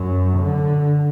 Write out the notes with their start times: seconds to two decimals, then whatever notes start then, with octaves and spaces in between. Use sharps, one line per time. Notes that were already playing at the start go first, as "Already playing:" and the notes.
Already playing: F#2
0.38 D3